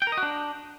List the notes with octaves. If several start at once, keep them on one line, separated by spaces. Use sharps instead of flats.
G5
A#4
D#5
F#4
D4